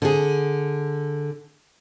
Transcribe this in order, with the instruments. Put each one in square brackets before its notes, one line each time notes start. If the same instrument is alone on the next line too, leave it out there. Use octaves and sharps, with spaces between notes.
[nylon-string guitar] D3 G#4